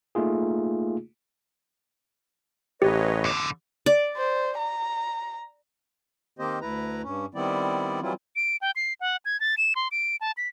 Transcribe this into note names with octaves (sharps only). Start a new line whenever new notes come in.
A3 A#3 D#4 F4 G#4
A1 G4 B4 C#5 D#5
E2 D3
D5
C5
A#5
D#3 A#3 C4 G4 C5 D#5
D2 E4 B4 A#5
G2 C#4
D#3 G3 B3 C4 E4 D5
E3 F#3 G3 C4 E4 F4
D7
G5
C7
F#5
G#6
A6
E7
C6
D7
A5
B6